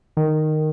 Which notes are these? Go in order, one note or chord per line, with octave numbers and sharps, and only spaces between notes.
D#3